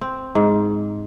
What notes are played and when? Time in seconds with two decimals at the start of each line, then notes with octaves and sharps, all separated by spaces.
0.01 C4
0.35 G#2